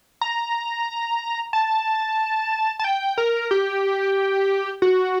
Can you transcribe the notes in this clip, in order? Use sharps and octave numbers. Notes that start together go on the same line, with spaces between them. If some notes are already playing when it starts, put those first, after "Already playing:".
A#5
A5
A5
G5
A#4
G4
F#4